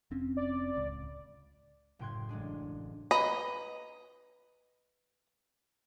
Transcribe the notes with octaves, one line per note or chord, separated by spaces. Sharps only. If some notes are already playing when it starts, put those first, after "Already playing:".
F1 C4 C#4
D5
D1 C#2
F#1 A2 G5 C6 F#6 G#6
A1 G#3 D4 G#4
B4 D#5 A#5